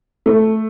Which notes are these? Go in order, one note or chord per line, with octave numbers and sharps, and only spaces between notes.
A3